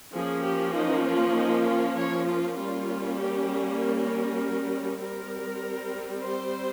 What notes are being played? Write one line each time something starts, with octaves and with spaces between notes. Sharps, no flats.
F3 A#3 C#4 G#4
G4
D#4
F4
D#4
F4
C#5
F4
G3 A#3 C#4 F4
G4
A#4
G3 C4 A#4
C5